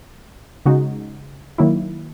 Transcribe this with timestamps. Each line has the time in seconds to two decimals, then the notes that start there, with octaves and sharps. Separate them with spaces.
0.66 C#3 G#3 D#4 F#4
1.58 D#3 F#3 A#3 E4